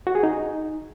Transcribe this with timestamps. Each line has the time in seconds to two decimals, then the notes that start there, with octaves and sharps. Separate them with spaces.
0.07 F#4
0.15 G#4
0.23 D#4